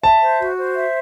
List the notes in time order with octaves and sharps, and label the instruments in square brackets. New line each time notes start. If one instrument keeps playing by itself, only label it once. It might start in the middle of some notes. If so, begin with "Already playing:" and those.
[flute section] E5 [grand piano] A5
[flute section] C5
F#4
C5
E5